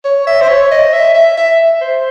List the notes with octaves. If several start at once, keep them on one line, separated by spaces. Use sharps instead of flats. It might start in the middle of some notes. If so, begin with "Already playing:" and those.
C#5
E5
C5
C#5
D#5
E5
E5
E5
C5